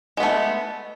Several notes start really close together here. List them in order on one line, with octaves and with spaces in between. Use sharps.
G#3 B3 A3